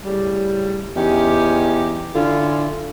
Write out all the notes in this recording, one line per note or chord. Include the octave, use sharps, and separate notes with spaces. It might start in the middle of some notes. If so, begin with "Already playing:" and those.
A2 C#3 G3
E2 C#4 D#4 G4
D3 C#4 E4 F4